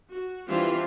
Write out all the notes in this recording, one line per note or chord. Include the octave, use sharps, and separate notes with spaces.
F#4
E3 G3 C4 D4 E4 F4